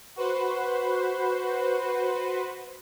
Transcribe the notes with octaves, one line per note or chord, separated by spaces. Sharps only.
F#4 B4 C5